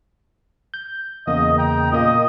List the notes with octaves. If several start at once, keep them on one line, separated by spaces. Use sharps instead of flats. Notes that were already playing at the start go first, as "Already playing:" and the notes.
G6
E2 C#3 A#3 D#5
G5 A#5
A#2 A#3 D#5